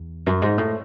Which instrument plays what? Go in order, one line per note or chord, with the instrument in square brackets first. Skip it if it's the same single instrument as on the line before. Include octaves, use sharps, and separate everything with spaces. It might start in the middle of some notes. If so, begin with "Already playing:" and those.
Already playing: [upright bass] E2
F#2
G#2
A2